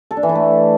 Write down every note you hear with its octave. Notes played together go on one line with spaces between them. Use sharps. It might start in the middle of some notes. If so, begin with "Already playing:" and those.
A4
D4
E3
E4
A3